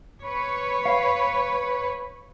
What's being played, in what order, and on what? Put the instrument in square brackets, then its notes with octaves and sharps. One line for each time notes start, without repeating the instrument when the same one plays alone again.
[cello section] B4 C#5
[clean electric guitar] F5